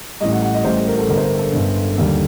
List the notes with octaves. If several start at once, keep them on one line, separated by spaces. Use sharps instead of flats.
A1 A2 G3 D#5
F#5
F#5
D#5
A1 A2 G3 C5
A4
A#4
A4
G1 G2 D3 A#4
C5
A#4
A4
G1 G2 D3
D#2 D3 G3